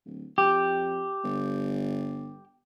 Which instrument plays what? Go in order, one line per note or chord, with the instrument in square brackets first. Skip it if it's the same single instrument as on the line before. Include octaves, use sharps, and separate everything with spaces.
[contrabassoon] D1
[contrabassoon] F2 [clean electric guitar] G4
[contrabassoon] G1